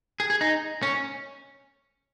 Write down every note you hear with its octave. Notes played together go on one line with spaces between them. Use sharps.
G#4
G#4
D#4
C#4